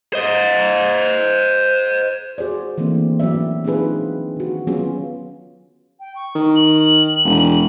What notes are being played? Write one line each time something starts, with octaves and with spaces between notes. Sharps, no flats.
C5 D#5
F#4 G#4 C5 D5
E3 A3 A#3 C4 D4
F#3 B3 C#4 D5 E5
C4 D4 D#4 F4 G#4 B4
D#3 F#4
F#3 B3 C#4 F4 F#4 G#4
G5
C#6
D#3
F#7
E1